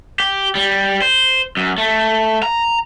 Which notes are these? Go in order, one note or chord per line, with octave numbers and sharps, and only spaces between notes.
G4
G3
C5
F#2
A3
A#5